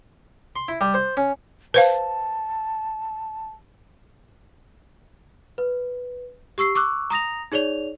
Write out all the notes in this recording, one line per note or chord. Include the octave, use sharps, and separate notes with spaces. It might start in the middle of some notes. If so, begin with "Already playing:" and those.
C6
E4
G3
C5
C#4
B4 C5 F5 A5
B4
G4 C#6 E6 C7
C#6 D6 E6 F#6
A#5 D#6 A#6 F7
D#4 G#4 C#5 D5 F7